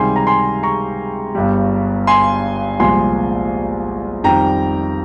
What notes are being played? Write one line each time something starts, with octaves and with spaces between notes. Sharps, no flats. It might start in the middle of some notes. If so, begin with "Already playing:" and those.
Already playing: C#2 C3 D#3 G3 G#5 C6
A#5
G#5 C6
A#5 C#6
G1 G2 G3
G#5 C6
C2 A#2 F3 G#3 G#5 C6
F2 D#3 G3 G5 A#5